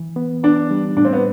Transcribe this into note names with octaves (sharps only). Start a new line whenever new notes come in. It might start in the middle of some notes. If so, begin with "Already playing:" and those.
Already playing: E3
B3
B3 D4
G3
A2 D4
C4
B3